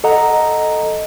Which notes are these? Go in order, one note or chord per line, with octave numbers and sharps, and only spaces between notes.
A4 D#5 F#5 A#5